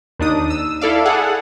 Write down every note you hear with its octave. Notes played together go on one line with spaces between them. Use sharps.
D#2 D4 D#4 D#6
E6
E4 A4 D5 F5
G#4 A4 F#5